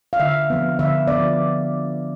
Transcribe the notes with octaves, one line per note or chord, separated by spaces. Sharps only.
F5
D3 E5
F3 B3
D3 E5
F3 B3 D5